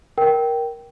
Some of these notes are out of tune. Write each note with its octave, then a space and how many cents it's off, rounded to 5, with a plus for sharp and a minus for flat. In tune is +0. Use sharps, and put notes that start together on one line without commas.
A#4 +10 G5 -15